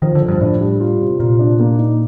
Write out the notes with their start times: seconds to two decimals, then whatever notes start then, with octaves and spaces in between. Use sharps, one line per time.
0.02 D#3 F3
0.15 D3
0.22 F3
0.28 G2
0.41 A2 D4
0.60 G3
0.80 F4
1.01 C3
1.19 A#2 F4
1.39 D4
1.59 A#3
1.78 D#4